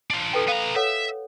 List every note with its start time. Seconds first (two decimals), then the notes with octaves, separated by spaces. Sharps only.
0.10 D4 F4
0.33 A4 B4 G5
0.48 B3 F5 A#5
0.76 A4 C#5 E5 F#5